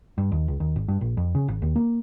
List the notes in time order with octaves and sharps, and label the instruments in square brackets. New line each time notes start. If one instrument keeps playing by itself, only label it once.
[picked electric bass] G2
D#2
C#2
D#2
G#1
G2
A#1
F2
C#3
G#1
D#2
A#3